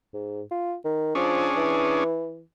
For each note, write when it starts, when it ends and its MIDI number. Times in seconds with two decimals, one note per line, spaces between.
0.14 0.42 44
0.51 0.75 65
0.85 1.11 51
1.15 1.49 53
1.15 2.04 61
1.15 2.04 62
1.15 2.04 68
1.57 2.42 52